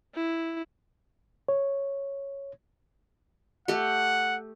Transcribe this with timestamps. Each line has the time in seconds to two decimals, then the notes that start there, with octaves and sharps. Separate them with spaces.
0.15 E4
1.48 C#5
3.68 A3 G4 F#5